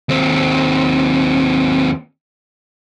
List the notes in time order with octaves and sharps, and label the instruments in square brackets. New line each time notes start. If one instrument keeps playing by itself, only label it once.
[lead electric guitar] D#2 C4